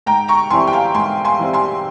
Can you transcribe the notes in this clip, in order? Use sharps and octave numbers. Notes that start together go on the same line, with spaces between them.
G#2 G5 A#5
A#5 C#6
E3 G3 C4 E4 G#5 C6
G5
F5 G#5
G#2 G#5 C6
G#5 C6
E3 G3 C4 E4
G#5 C6